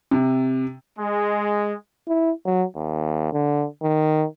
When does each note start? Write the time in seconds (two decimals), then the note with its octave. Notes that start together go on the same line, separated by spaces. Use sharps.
0.11 C3
0.98 G#3
2.08 E4
2.46 F#3
2.76 D#2
3.33 D3
3.82 D#3